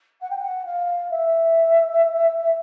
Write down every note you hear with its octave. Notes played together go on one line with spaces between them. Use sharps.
F#5
G5
F#5
F5
E5